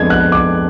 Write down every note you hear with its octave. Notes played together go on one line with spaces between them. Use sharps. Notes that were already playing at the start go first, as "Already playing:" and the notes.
Already playing: F2 F3 G#3 B3 D4 G#6
F#6
D6